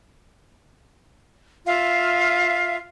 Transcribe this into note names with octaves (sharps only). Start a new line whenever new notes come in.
F4 E5 F5